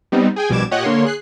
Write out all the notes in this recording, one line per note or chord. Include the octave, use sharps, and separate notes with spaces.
G3 B3 C4 D#4
G#4 G5 G#5
A#1 B2 G3 D6 G#6 E7
A#2 G4 C#5 D#5 F#5 F#6
D3 A#3 C#5 C6
G#4 F#6 C7